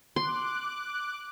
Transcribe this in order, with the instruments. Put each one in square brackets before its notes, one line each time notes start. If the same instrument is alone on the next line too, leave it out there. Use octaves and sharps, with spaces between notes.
[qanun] C6 [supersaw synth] D6 F#6